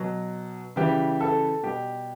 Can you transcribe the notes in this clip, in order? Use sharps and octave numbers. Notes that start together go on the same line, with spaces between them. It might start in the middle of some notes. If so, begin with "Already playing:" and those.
Already playing: B2 F#3
C#3 E3 G3 G4
A4
B2 G3 G4